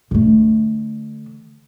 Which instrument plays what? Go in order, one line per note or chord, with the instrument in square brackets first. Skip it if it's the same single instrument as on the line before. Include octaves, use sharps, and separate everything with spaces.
[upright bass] D3 A3